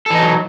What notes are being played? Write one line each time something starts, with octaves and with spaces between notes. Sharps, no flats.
E3 F#3 D#4 A4